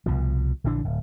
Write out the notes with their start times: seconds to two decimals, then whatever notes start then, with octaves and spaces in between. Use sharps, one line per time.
0.06 C2 B2 F3
0.64 A#1 D3 E3 D4
0.85 D1